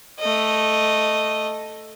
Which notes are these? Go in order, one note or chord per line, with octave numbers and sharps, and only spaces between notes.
A3 D#5